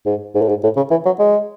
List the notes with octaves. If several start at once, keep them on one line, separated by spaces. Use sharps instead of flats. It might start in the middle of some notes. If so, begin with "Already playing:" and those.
G#2
G#2
A2
G#2
A2
C#3
E3
F#3
G#3